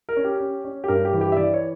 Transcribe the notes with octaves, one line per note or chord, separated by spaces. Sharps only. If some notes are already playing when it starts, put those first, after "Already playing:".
A#4
C#4
G4
C#4
C#4
G4
G2 A#4
G4
E3
G4
E5
E3 D5
C#5